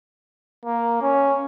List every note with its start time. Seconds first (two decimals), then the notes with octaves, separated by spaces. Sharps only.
0.66 A#3
1.02 C#4